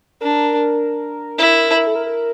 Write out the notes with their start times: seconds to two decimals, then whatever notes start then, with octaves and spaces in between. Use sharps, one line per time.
0.21 D4 A#4
1.38 E4
1.77 A#4
1.87 A4
1.95 A#4
2.06 A#4